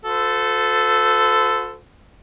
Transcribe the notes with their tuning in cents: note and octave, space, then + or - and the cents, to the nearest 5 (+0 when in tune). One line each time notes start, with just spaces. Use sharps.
F#4 -45 A4 +0 C5 -40